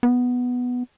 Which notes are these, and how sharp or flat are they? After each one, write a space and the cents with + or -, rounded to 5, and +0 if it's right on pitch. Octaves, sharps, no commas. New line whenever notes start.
B3 +0